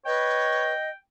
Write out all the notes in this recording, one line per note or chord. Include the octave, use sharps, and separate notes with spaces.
B4 C#5 D#5 G5